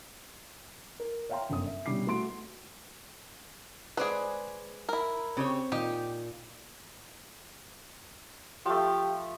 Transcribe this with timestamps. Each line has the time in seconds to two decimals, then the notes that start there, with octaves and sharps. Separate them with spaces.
1.00 A#4
1.29 C#5 E5 F5 G5 A#5 C6
1.50 G1 F#2 C#4 D#6
1.67 E5
1.86 B2 D3 G3 C#4 D6 C7
2.07 A3 F#4 C6 D7
3.97 G#3 G#4 B4 C5 D5
4.89 E4 A#4
5.37 C#3 C4 G4 C#5
5.72 A#2 D#4 G4
8.66 F3 A3 G4